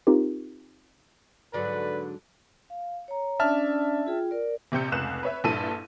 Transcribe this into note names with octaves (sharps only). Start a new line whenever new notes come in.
C4 D#4 F4 G4 A#4
G#2 D3 F#3 B4 D5
F5
C#5 A#5
C#4 D4 D5 E5 A5 F6
F4 G#4 G5
A#4 D5
A#1 C3 G4 G6 C#7
F1 C#2 F#6 E7
B4 C#5 E5
A#1 G2 E4 A4 A5 D#7